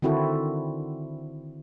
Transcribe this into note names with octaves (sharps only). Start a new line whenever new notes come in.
D3 D#3 C4 E4 F#4 A4